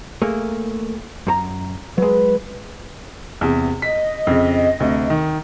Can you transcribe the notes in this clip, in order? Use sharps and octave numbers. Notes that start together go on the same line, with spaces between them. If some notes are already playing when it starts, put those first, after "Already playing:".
A3 A#3 G#4
F#2 A4 A#5
F#3 G#3 B4
E2 C3
D#5 B6
F2 C#3
D2 C3
D#3